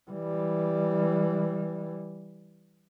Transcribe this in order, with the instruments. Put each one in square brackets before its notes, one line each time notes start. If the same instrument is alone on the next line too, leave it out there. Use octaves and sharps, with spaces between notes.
[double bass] E3 G3